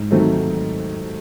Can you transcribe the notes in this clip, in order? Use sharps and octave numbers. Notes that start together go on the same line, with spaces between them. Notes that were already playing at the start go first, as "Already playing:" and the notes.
Already playing: G#2
D#3 F#3 A3 C4